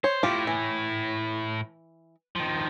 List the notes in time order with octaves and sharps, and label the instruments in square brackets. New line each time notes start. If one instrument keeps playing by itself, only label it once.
[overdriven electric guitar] C5 [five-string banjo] C#5
[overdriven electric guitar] A2 E4 [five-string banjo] F4 G4
[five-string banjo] E3
[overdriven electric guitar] D#3 F3